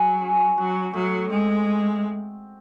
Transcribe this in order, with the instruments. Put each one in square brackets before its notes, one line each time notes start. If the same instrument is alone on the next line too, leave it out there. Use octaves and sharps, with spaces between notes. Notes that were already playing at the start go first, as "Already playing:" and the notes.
Already playing: [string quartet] F#3 [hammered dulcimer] G#4
[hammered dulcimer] C#4
[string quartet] F#3 [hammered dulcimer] F#4
[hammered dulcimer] A2 [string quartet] F#3
[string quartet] G#3 [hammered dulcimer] C4